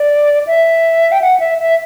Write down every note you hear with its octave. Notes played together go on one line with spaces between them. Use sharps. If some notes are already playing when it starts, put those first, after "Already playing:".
Already playing: D5
E5
G5
F#5
E5
E5